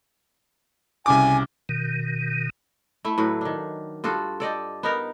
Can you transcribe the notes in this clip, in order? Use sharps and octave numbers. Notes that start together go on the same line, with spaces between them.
C2 C#3 G#5 D6
B2 D#3
A3 E4
A2 F#3 B4
D#3 D4
G2 F4 F#4 A4
A4 D5 D#5 G5
B3 D#4 A#4